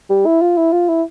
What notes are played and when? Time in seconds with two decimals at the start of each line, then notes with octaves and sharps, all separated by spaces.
0.10 G3
0.25 E4
0.41 F4
0.57 E4
0.72 F4
0.89 E4